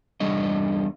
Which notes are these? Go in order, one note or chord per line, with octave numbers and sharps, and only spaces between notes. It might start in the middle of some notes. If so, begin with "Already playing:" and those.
E2 G3 D4 D#5